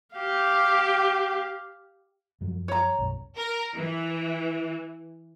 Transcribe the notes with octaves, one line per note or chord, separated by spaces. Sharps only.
G4 F5
F#2 F3 F#3
C#5 A#5
B1 F#2
A#4
E3